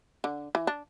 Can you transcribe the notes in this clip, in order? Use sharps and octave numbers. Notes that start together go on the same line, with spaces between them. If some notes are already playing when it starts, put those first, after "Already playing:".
D3
E3
D4